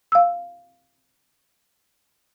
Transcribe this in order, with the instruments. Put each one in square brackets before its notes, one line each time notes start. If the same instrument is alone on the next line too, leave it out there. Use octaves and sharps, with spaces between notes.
[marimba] F5 E6